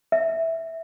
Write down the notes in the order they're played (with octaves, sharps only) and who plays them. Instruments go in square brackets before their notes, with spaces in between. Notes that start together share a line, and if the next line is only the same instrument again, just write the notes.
[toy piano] E5